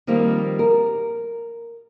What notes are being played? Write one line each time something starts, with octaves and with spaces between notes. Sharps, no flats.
D#3 F3 G3 A#3 C4
A#4